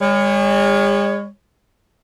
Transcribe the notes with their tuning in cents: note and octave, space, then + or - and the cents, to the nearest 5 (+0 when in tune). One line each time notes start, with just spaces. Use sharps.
G#3 -45 C#5 +0